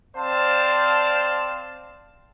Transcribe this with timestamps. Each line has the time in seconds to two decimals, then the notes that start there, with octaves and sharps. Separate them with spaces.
0.16 C4 C5 D5 F5 A5